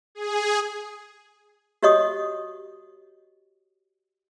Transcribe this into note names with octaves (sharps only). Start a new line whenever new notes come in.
G#4
F#4 G4 C#5 D#5 C#6 D#6